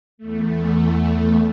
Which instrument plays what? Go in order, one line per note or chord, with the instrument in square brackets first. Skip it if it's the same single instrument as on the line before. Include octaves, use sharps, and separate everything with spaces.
[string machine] E2 A3